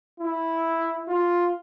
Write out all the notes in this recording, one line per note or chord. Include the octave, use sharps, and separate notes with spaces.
E4
F4